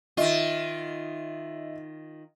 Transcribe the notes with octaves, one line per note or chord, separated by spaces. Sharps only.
D#3 F4 D#5 E5